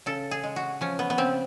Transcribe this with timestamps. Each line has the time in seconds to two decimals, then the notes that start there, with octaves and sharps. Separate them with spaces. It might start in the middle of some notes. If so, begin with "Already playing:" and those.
0.06 C#3 A4
0.31 G#4
0.43 G#3
0.56 F#4
0.81 F3 C#4
0.99 B3
1.10 B3
1.18 C#3 C4